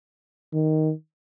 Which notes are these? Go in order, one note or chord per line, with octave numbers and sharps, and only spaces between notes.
D#3